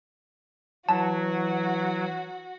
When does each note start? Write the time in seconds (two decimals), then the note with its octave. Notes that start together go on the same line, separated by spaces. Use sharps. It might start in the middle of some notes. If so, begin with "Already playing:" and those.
0.89 E3 F#3 F#4 A5